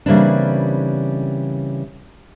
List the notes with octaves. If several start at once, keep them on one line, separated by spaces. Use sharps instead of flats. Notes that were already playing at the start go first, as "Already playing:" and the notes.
C#3 E3 G3 A#3 C4 D4